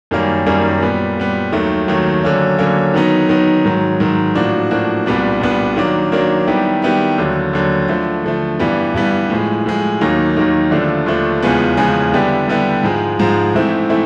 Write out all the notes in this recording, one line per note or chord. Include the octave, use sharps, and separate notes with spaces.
F#2 D#3 G3 A#3 C#4
F#2 D#3 G3 A#3 C#4
A#2 G3 B3
A#2 G3 B3
D#2 D#3 F#3 A3
D#2 D#3 F#3 A3
D3 F#3 A#3 C#4
D3 F#3 A#3 C#4
D#3 F#3 B3 D#4
D#3 F#3 B3 D#4
G#2 D#3 F#3
G#2 D#3 F#3
A2 F3 A#3 D4 F#4
A2 F3 A#3 D4 F#4
C2 A#2 G3 B3 D4
C2 A#2 G3 B3 D4
D#3 F#3 A#3 D4
D#3 F#3 A#3 D4
D#3 G3 B3 E4 G4
D#3 G3 B3 E4 G4
D#2 D3 F#3
D#2 D3 F#3
D3 F3 A3
D3 F3 A3
G2 E3 G3 B3
G2 E3 G3 B3
A2 F3 G#3
A2 F3 G#3
D#2 D#3 F#3 A#3 D#4
D#2 D#3 F#3 A#3 D#4
D#2 D3 F3 A3 D4
D#2 D3 F3 A3 D4
E2 C#3 F3 G#3 B3
E2 C#3 F3 G#3 B3
D3 G3 B3 E4 G4
D3 G3 B3 E4 G4
G#2 F3 G#3
G#2 F3 G#3
G#2 E3 A3 C4 E4
E3 A3 C4 E4